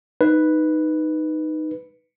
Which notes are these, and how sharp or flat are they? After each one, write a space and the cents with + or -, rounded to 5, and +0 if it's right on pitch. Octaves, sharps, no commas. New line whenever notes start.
D#4 -5 B4 +0